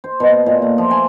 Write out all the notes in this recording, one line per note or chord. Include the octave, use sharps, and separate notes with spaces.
C5
B2
D#5
A#2
A3
F3
G#5